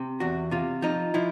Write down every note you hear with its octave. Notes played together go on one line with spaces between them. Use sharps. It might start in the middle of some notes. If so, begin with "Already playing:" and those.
Already playing: C3
E2 F#4
C3 F4
F3 D#4
F3 E4